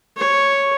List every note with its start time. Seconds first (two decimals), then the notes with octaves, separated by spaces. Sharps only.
0.17 C#5